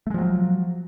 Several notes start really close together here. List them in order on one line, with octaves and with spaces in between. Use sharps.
A3 G#3 F3 F#3